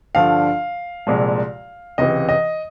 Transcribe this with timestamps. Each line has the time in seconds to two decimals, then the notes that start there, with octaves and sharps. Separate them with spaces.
0.15 G2 D3 F3 F5
1.07 C2 A#2 F3 G#3
1.98 C#2 C3 E3 D#5
2.29 D#5